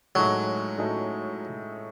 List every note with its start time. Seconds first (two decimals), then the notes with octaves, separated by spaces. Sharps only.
0.15 A2 F#3 G#3 D#4 F#4 A4
0.78 A2 G#3 D#4 F#4 A4